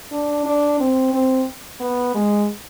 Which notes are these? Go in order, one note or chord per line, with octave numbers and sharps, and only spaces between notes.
D4
D4
C4
C4
B3
G#3